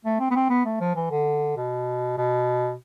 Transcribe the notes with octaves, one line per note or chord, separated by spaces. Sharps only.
A3
C4
B3
C4
B3
A3
F3
E3
D3
B2
B2